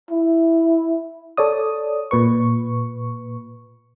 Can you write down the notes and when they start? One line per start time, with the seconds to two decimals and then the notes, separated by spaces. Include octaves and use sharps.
0.10 E4
1.37 A4 C#5 D5 D#6
2.11 A#2 B4 C#6